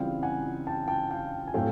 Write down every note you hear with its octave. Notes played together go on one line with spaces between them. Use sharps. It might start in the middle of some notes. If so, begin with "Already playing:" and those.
Already playing: C#3 E3 G3 C4 F4 F5 G5
F#5 G#5
G5 A5
G5 A5
F5 G5
G#5
A2 F#3 A3 C4 F5 G5